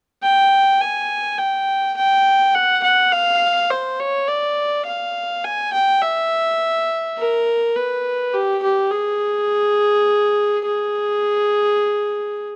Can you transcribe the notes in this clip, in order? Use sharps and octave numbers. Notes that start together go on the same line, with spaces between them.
G5
G#5
G5
G5
F#5
F#5
F5
C5
C#5
D5
F5
G#5
G5
E5
A#4
B4
G4
G4
G#4
G#4